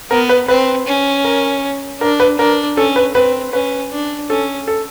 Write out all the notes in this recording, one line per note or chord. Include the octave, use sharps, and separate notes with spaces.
B3 A#4
B4
C4 B4
C#4
A#4
D4 A#4
B4
D4 A#4
C#4 A4
B4
C4 B4
C#4 B4
D4
C#4 A4
A4